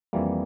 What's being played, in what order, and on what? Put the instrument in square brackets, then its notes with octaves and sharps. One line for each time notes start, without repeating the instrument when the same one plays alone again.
[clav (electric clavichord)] F2 E3 G3 A#3